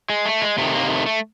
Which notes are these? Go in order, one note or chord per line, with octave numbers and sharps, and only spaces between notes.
G#3
A3
G#3
C3 D#3 A3
A#3
A3
A3